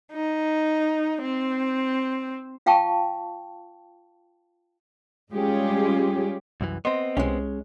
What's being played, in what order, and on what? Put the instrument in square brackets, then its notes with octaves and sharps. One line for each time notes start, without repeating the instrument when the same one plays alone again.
[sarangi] D#4
C4
[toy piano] F4 F5 G5 A5 C#6
[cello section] G3 G#3 C#4 F4 G4 G#4
[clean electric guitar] C2 F#2 E3
[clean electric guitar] B3 C4 [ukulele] D#5 [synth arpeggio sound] C6
[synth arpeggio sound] C2 E4 G4 [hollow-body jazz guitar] G#3 C#4